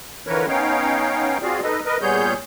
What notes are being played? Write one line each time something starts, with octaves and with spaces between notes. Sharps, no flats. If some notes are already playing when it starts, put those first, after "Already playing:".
D3 E3 F3 A#4 B4 C#5
B3 C#4 D#4 C#5 F5 G5
C4 F4 F#4 G#4 D5 F5
D#4 A4 B4 D#5
A#4 B4 D#5
A#2 G3 B3 G#4 C#5 G6